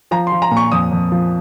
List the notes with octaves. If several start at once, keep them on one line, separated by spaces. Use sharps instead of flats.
F3 A#5
C6
F3
A#5
A#2
C#6
F2 D#6
F2
F3